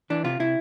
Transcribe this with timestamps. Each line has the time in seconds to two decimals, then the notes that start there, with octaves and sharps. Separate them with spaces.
0.10 E3 D4
0.24 C3 F4
0.40 C3 E4